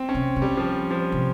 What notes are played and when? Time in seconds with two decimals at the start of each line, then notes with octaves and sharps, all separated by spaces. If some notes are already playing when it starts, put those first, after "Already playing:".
Already playing: C4
0.09 C#4
0.15 C3
0.36 C#3
0.42 G3
0.57 F3
0.91 F3
1.12 C3